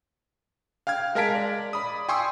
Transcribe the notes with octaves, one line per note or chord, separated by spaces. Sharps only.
F5 G5 F6 G#6
G#3 A#4 F5 A5 B6 D7
D5
D5 B5 D#6
G5 G#5 C6 C#6 D#6 E6